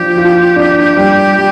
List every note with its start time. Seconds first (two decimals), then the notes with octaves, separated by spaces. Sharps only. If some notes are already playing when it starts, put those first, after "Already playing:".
Already playing: F3 D4 G4
0.17 F4
0.56 D4
0.96 G3
1.36 G3